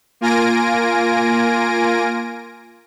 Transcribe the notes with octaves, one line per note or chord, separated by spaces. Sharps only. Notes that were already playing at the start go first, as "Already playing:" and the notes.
A#3 F4 G#5 A#6 D7